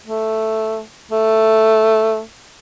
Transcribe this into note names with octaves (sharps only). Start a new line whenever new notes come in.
A3
A3